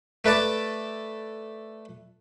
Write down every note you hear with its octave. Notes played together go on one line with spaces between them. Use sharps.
A3 B4 D5 A5